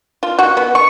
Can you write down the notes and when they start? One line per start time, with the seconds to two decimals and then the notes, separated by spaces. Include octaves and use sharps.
0.23 F4
0.39 F#4
0.57 B3
0.75 C#6